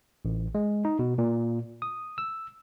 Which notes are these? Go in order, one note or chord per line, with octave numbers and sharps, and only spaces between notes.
A1
G#3
D#4
B2
A#2
D#6
E6